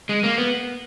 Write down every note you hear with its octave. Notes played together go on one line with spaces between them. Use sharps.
G#3
A#3
B3